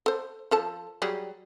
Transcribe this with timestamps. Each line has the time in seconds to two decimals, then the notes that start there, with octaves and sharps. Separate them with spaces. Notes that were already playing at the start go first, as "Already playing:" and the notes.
0.06 A4 C5
0.51 F3 A4 A5
1.02 F#3 G3 G#4